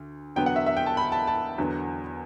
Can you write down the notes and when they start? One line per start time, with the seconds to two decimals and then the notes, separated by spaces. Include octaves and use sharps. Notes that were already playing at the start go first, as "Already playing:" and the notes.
Already playing: D2
0.36 E2 D3 F#3 B3 G5
0.46 F#5
0.56 E5
0.66 E5
0.77 G5
0.86 A5
0.97 B5
1.12 A5
1.27 A5
1.58 E2 D3 F#3 B3